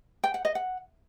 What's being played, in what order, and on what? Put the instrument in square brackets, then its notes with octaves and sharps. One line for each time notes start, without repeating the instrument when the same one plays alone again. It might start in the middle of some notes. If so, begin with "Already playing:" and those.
[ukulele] G5
F#5
D#5
F#5